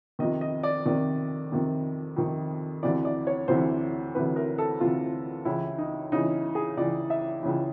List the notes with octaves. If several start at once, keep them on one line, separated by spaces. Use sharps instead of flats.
F2 C3 D#3 D#5
D#5
D5
F2 C3 D#3 D5
F2 C3 D#3
F2 C3 D#3
D2 C3 E3 D5
D5
C#5
D2 C3 E3 C5
D2 C3 E3 B4
A#4
A4
D2 C3 E3 F4
C#2 C#3 E3 E4
D#4
C#2 C#3 E3 D#4
G#4
C#2 C#3 E3 D5
E5
C#2 C#3 E3